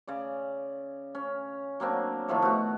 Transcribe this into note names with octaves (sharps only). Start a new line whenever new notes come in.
C#3 D5
C#4
F#3 A#3 C4 D4
A2 D#3 F3 A3
B2 F#4